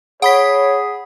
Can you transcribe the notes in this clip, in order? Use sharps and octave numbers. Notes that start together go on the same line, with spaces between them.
G#4 C#5 F#5 B5 B6